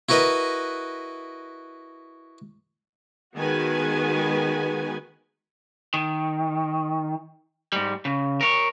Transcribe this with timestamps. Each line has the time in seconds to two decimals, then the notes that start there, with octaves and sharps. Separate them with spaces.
0.09 E4 F#4 A#4 B4 D#5
3.35 D#3 G#3 B3 F#4 B4 G#5
5.94 D#3
7.72 G#2 G3
8.05 C#3
8.41 A#4 C#5